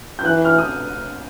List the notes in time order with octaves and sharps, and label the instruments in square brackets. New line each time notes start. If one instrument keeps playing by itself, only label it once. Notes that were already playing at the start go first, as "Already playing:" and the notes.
[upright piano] G6
[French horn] E3 [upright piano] F#6
[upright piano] F6
D#6